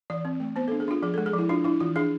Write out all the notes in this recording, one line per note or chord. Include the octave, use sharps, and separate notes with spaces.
E3 D5
C4
A3
B3 C5
D4 A4
G#4
D4 F4
F3 G#4
G#3 A4
G#4
F3 E4
D4 F4
D4 E4
E3 F4
D4 G#4